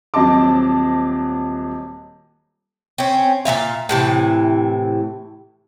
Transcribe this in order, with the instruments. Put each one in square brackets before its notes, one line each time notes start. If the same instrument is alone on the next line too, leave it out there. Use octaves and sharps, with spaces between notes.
[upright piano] D#1 F#3 C4 D#5 A5 D6
[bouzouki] C4 C#4
A#2 G#3 E5 F5
A2 C3 E3